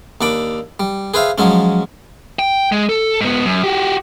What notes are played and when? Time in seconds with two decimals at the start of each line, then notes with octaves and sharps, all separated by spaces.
0.21 D#2 D4 B5 D6
0.80 G3
1.14 G#4 B4 C5 E5 F5
1.38 F3 F#3 G#3 C#4
2.39 G5
2.72 G#3
2.89 A4
3.21 G#2 B3
3.46 F#2
3.64 F#4 G4